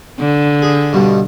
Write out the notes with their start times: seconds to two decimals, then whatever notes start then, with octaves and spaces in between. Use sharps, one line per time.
0.20 D3
0.62 G#4
0.93 G2 B2